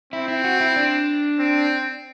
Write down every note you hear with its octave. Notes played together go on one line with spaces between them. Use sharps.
C4 E4
E4
F#4
E4
D4
C4